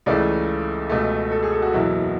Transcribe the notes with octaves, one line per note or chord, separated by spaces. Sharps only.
C#2 C#3 E3 A3 D5
C#2 B2 A3
A4
G#4
A4
F#4
F#1 E2 B2 F#3 E4